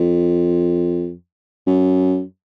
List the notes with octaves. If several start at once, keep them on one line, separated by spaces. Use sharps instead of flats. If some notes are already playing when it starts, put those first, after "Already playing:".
Already playing: F2
F#2